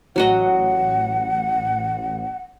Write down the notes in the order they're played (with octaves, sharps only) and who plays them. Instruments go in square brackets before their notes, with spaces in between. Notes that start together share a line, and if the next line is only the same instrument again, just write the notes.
[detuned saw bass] A1 [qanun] F#3 F#4 D#5 [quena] F#5